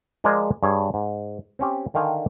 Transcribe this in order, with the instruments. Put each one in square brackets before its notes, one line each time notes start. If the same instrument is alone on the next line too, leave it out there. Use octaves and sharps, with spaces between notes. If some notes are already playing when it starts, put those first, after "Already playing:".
[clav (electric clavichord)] F3 G#3 G#4 A#4 D5 D#5
G2 G#4 C#5
G#2
C4 C#4 G4
D3 D#3 A#4 F5 G5 G#5